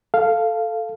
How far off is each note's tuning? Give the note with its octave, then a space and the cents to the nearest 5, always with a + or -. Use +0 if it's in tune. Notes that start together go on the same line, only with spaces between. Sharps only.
A4 +0 F5 -10